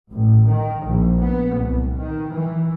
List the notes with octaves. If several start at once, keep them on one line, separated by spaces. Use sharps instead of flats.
A1
D#3
A#1
B3
C2
D#3
E3